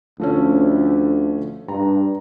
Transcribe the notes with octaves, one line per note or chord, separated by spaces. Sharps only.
D2 F3 A3 C#4
G2 A#5